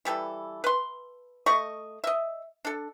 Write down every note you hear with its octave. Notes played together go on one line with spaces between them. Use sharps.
E3 G3 A4
B4 C6
A3 D#5 C#6
D#5 E5
D4 A4